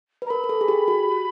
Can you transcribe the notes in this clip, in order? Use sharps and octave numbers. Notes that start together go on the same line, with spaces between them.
B4
A#5
A#4 B5
A#4
A4
G#4
G4
F#4